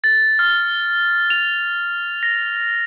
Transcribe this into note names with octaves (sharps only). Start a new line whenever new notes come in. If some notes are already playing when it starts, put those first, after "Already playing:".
A6
F6
F7
A#6